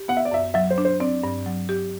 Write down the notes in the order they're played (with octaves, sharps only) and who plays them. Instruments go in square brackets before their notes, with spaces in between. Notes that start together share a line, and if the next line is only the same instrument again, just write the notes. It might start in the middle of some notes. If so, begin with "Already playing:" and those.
Already playing: [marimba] G4
[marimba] B3 [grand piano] F#5
[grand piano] E5
D5
[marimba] F#2 [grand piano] E5
[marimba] F#3 [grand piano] E5
[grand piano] C5
[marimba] D4
[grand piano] C5
[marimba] C4 [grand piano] D5
[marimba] G2
F#3
G4